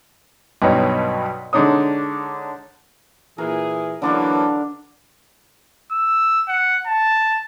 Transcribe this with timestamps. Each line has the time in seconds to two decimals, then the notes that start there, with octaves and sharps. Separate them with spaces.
0.62 B1 G2 B2 D#4 C#5
1.53 D3 G#3 D4 D#4 C#5 D#6
3.38 A#2 E3 G#4 A#4
4.02 D3 E3 F#3 A#3 D4 A#4
5.91 E6
6.48 F#5
6.86 A5